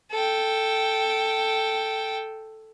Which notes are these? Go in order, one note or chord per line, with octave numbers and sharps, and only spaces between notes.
A4 G5